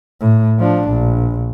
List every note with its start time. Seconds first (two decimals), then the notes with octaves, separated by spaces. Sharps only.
0.21 A2
0.59 F3 D4
0.90 A#1